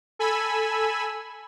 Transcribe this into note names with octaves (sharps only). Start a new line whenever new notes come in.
A4 G#5 B5 E6